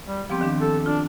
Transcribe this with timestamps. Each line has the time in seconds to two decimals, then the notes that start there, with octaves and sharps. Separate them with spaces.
0.06 G3
0.30 F3 B3 C4 G4
0.41 D#3 D4
0.61 A4
0.86 D4 F4